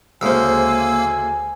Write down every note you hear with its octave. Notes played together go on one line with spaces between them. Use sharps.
D2 C#3 G#3 A#3 C5 G#5 E6